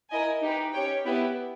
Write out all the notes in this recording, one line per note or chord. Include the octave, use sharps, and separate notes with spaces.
E4 A#4 D#5 G#5
D#4 G4 B4
C#4 G4 C#5 G5
B3 E4 G4 B4